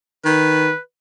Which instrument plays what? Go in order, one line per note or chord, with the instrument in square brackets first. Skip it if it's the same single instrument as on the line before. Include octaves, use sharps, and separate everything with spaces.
[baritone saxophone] D#3 [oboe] B4